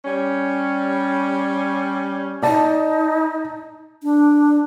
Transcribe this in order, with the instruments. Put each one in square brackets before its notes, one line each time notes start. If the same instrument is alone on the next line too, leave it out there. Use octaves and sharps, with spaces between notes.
[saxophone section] G3 C#4
[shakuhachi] D#4 [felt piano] D5 A5
[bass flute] D4